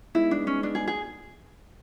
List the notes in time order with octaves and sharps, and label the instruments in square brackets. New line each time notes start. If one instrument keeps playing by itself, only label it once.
[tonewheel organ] G#3 B3 D#4 [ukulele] E4
[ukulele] D4
C#4
D4
G#4
G#4